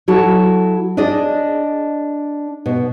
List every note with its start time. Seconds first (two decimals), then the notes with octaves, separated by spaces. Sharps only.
0.08 F#3 E4 F#4 A4 A5
0.97 D4 G#4 D5 D#5
2.66 B2